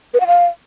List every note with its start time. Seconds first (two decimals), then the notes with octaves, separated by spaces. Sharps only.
0.14 B4
0.20 F#5
0.27 F5